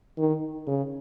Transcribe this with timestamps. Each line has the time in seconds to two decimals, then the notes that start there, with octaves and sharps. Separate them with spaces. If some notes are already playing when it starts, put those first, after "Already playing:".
0.18 D#3
0.67 C#3